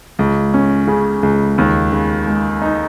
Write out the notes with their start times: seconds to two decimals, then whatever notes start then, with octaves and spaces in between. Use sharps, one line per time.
0.19 C#2
0.54 C#4
0.87 C#3
1.23 C#2
1.58 D#2
1.92 C#3
2.27 G#3
2.62 D#4